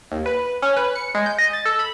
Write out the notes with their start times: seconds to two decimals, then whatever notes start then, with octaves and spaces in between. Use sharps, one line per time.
0.12 D#2
0.26 B4
0.62 C#4
0.77 B4
0.96 C#7
1.15 G#3
1.26 G6
1.38 D#5
1.53 A6
1.66 A4
1.79 B5